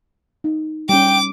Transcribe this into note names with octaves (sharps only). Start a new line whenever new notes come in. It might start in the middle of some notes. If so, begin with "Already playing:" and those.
D#4
G3 C#4 G5 D6